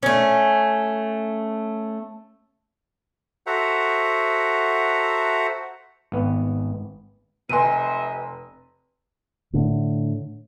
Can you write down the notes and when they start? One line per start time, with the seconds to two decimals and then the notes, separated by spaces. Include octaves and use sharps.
0.03 A3 C#4
3.47 F#4 A4 C5 E5 F#5 A#5
6.12 G#1 B3
7.49 F1 C3 B4 D#5 E5 G#5 C6 D#7
9.53 A2 D3